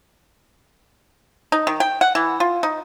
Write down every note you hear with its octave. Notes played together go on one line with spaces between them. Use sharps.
D#4
D#3
G5
F#5
E3
F4
D#4